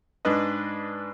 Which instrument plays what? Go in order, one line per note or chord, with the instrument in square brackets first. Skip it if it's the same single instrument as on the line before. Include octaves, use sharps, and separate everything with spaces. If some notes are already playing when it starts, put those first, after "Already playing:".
[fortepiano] G#2 D4 B4 D#5